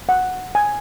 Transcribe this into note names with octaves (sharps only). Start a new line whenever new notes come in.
F#5
G#5